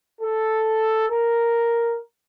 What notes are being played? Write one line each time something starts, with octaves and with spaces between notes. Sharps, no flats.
A4
A#4